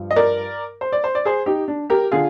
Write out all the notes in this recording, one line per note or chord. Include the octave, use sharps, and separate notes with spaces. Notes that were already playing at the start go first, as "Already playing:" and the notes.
Already playing: G2 F3
D#5
A#4 D5
C5
D5
C5
D5
G#4 C5
D#4 G4
D4
G4 A#4
D3 F4 G#4